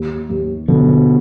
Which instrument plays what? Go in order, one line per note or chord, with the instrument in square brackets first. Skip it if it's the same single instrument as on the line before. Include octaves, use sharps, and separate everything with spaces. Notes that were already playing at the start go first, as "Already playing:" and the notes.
Already playing: [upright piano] D#2
D#2
[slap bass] B2 [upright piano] D3